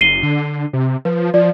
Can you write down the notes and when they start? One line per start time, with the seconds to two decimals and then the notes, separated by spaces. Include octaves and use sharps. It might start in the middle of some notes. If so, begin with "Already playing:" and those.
0.01 F#1 C7 D#7 G7
0.23 D3
0.73 C3
1.05 F3 B4
1.34 F3 D5